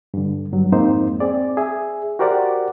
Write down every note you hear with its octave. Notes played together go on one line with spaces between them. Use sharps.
G2 D3
G2 F#3
F2 G#2 A#3 C4 D#4 C5
C4 G#4 D5
G#4 E5
F#4 G4 A#4 C5 D5 F#5